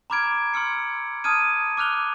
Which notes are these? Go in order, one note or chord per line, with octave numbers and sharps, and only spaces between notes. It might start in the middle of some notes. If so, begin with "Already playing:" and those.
A#5 B5 D6 F6 G#6 D7
C6 E6 F6 C#7
A5 D#6 F6 G#6 D#7
D6 F6 F#6 F7 G7